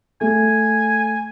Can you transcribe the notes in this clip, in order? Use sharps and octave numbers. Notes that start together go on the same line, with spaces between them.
A3 G#5